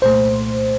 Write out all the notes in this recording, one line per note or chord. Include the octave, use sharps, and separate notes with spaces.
C2 A#2 A3 C5